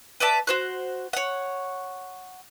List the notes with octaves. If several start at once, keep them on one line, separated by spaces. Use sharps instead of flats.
B4 D5 E5 A5
F#4 C5 F#6
C#5 F#5